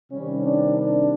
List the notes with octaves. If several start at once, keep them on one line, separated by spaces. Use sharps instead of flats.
C3 D#3 G3 C#4
D4
D4